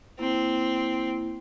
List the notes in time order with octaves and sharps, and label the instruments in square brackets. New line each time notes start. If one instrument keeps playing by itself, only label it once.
[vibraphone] A#3 E4 [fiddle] C4